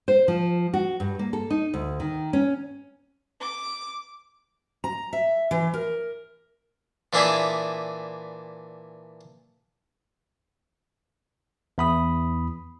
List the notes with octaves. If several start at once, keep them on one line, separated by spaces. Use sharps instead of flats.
C5
F3
F#4
G2
A#3
A4
D#4
D2
D#3
C#4
D6
A#5
E5
E3
A#4
A#2 E3 D4 E4 G#4 E5
E2 B5 D#6